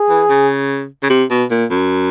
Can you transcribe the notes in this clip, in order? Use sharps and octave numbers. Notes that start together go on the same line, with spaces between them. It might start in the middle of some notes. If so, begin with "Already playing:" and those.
Already playing: G#4
E3
C#3
C#3
C3
B2
A#2
F#2